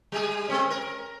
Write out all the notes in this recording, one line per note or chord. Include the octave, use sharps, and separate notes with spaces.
G3 G#4
G#3 C4 C#4
A#4